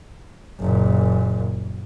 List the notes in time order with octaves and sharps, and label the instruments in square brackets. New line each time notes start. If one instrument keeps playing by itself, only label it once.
[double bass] F#1 A#2